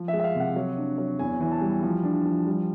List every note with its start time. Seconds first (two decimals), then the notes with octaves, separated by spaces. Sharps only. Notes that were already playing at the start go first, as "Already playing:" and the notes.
Already playing: F3
0.08 E5
0.13 G#3
0.20 E5
0.24 F5
0.35 C3
0.40 F#5
0.56 F#3
0.77 D4
0.98 F#3
1.19 E2 G#5
1.40 E3
1.52 A5
1.61 G3
1.82 F3
2.03 D4
2.25 F3
2.47 G3